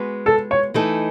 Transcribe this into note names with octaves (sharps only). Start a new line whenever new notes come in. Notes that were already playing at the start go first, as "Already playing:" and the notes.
Already playing: G#3 B3 F#4 B4
A4
C#5
E3 A3 D#4 A4